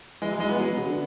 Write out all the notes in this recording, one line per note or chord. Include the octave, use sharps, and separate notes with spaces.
E3 G#3
F#3
G#3
B3
F#3
B2
C#3
D3